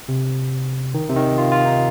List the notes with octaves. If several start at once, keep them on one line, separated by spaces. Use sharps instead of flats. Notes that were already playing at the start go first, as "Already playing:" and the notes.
C3
D#3
C3
D#3
F4
F4
D#4